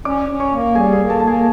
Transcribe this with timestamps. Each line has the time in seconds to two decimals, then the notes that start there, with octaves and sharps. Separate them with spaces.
0.05 C#4 D5 D6
0.28 C#4
0.40 C#5 C#6
0.52 A#3
0.75 G3 G#4 G#5
0.93 G#4 G#5
0.98 A#3
1.10 A4 A5
1.20 A#3 A5
1.27 G#4 G#5